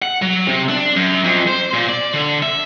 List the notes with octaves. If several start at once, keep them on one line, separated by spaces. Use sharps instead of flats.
F#5
F#3
C3
D4
F#2
F2
C5
A#2
D5
D3
E5